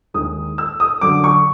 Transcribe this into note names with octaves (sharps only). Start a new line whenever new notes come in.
D#2 D#3 G#3 D#6
E6
D#6
F#2 D3 F#3 D6
C#6